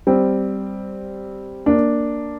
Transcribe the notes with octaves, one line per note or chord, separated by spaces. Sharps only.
G3 C4
A#3 D4